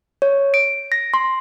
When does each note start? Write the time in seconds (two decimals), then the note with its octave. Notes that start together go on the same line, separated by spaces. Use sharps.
0.22 C#5
0.54 D7
0.92 A#6
1.14 C6